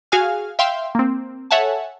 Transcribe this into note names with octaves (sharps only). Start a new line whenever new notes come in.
F#4 G#4 F5 G#5 F6
E5 F5 G5 C6
A#3 C4
A4 C#5 E5 F#5 G#5 A5